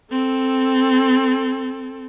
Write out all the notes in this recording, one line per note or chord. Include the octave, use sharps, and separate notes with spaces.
C4 A4